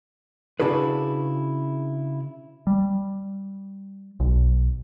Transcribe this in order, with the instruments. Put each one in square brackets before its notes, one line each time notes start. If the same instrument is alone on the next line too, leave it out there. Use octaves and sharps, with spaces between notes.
[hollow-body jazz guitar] C#3 D4 E4 F#4 G#4 B4
[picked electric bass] G3
B1